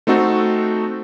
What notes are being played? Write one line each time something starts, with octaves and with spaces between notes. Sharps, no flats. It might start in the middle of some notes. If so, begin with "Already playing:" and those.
A3 C4 D#4 F#4 A4